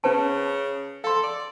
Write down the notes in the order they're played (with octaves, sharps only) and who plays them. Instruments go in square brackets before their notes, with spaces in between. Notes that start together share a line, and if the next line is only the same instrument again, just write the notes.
[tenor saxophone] C#3 [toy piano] C#4 B4 A5
[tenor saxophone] A4 [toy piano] F5 C6
[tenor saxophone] D5